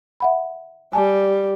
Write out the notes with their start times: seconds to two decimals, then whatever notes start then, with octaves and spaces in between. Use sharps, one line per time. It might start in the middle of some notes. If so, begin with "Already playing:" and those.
0.20 E5 F#5 B5
0.93 G3 G#5 A5